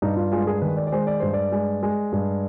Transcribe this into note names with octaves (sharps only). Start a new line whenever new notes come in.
G2 D#4
F4
G#3 F4
G#4
D#3 B4
D5
D5
G#3 C5
D5
G2 C5
D5
G#3
G#3
G2